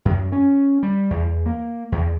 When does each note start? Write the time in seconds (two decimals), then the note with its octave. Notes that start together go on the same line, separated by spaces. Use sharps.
0.05 F#2
0.32 C#4
0.83 G3
1.11 E2
1.46 A#3
1.92 E2